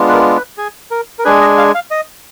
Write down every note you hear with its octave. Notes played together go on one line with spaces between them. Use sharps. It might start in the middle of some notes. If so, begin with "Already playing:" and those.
Already playing: G#3 B3 D4 F4
B4
A#4
B4
G#4
A#4
A#4
G#3 D4 G#4 B4
D#5
F5
F5
D#5